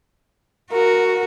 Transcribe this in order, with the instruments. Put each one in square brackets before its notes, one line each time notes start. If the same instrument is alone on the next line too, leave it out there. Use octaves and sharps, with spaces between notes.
[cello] F#4 [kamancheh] A#4